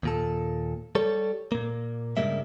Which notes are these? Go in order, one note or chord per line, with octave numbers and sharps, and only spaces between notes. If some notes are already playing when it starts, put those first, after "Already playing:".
D#2 A#2 A4
G3 A4 C#5
A#2 A#3
G2 C#3 G3 G#3 A#3 E5